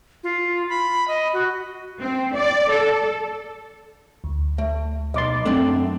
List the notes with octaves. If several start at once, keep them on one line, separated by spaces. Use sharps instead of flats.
F4
B5
D#5
F#4
C4
D5
A4
D2
A3
B1 D#5 C6 D6 A6
F#2 A3 C4 D4